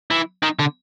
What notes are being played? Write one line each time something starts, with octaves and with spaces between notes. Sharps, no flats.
E3
D#3
D3